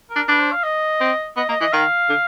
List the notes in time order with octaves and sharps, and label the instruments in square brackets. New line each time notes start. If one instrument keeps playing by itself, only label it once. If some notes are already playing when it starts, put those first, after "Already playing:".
[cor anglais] A#4
[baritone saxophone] D4
[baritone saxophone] D4 [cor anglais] B4
[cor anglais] C5
F5
D#5
[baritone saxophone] C4
[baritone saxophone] B3 [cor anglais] D#5
[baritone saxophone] A#3 [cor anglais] D#5
[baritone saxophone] E3 [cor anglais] D#5
[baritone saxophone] D#3 [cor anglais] F5
[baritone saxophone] D3